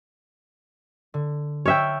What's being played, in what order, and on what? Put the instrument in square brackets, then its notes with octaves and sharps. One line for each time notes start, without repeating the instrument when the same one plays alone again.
[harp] D3
[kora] C#5 E5 G5 [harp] A5 E6 F6